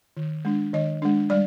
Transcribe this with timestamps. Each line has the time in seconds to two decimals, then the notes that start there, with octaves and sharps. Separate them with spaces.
0.17 D#3
0.45 G#3 D4
0.73 D#3 D#5
1.02 G#3 D4
1.30 G3 D5